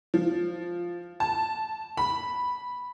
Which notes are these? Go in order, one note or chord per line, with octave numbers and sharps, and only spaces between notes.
F3
A5
B5